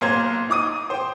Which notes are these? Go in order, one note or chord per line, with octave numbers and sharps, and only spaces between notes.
B1 A#3 C5 A#5 G#6
D#4 D6 D#6 D#7
C5 G5